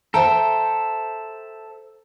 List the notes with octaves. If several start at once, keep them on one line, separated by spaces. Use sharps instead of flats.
A4 C5 E5 G5 A#5